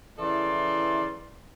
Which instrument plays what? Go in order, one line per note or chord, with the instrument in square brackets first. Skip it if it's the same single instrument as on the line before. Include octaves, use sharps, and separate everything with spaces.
[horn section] C#3 E3 E4 A4 D5 C6